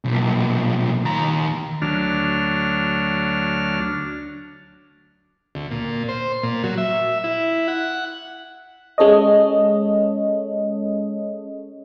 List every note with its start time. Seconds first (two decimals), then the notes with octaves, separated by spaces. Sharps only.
0.04 B1 A#2
1.05 D#2 A#5
1.82 D2 F#3 D4 F6
5.55 D2
5.71 A#2
6.09 C5
6.43 A#2
6.64 F#3
6.78 E5
7.24 E4
7.68 F#5
8.98 G#3 C#4 A4 C#5 D#5